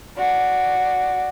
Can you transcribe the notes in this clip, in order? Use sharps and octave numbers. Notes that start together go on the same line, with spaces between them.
F#4 D5